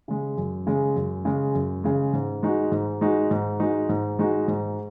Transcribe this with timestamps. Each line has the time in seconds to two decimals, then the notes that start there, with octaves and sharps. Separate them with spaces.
0.08 C#3 G#3
0.38 F#2
0.67 C#3 G#3
0.96 F#2
1.25 C#3 G#3
1.55 F#2
1.84 C#3 G#3
2.13 G#2
2.43 G#3 D#4 F#4
2.72 G#2
3.01 G#3 D#4 F#4
3.31 G#2
3.60 G#3 D#4 F#4
3.89 G#2
4.19 G#3 D#4 F#4
4.48 G#2